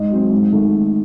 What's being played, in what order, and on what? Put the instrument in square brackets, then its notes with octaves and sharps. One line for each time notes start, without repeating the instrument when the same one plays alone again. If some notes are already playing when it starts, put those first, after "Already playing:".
Already playing: [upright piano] G#2 D#5
F#3 C4
G#2
D#3 A3